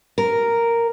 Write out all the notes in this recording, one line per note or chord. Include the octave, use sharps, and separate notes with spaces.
A#4